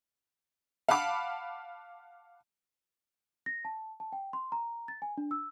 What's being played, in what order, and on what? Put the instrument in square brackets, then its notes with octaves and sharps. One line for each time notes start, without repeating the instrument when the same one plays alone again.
[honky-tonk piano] F5 F#5 A5 B5 D6
[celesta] A#6
A5
A5
G5
C6
A#5
A6
G#5
D4
E6